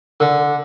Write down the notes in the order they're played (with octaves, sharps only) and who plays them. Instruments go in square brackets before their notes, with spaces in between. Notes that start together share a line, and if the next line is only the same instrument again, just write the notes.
[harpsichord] D3